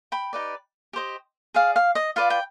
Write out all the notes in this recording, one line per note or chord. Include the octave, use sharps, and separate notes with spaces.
G5 B5
D#4 G4 B4 D5
G4 C5 D#5
G#4 D5 F5
F5
D#5
F4 B4 D5 F5
G5